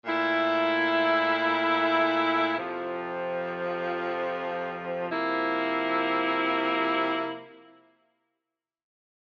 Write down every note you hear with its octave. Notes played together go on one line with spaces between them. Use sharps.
A#2 A3 E4
F2 C3 F3
C3 F3 A#3 E4